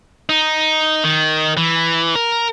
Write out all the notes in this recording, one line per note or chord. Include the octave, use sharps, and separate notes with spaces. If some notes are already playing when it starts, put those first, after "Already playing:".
D#4
D#3
E3
A#4